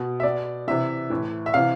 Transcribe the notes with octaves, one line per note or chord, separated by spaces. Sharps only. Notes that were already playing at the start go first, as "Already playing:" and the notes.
Already playing: B2
E5
B2 D5
C3 E3 E5
A2 E3
E5
C3 E3 F5